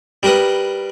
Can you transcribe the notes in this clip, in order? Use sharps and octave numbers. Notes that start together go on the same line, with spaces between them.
G3 G4 A#4 B4 D#6